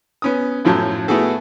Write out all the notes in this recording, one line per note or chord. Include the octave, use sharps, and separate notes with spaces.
B3 C#4 D#6
F#2 A2 F3 F#3 A5
A3 B3 E4 F#4 G#4 A4